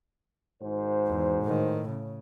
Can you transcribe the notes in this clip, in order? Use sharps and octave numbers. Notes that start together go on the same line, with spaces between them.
G#1 G#2 C5
E2
A2 D#3
C#3